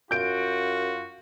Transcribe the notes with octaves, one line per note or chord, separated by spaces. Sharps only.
F#2 F4 F#4 G6 D7